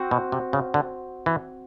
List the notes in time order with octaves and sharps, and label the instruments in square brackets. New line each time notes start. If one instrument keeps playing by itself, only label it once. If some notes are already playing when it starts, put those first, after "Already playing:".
Already playing: [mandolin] C4 F#4
[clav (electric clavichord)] B2
C3
C#3
D3
E3